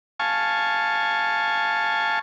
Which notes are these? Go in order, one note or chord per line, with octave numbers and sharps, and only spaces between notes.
F5 G#5 A5 C#6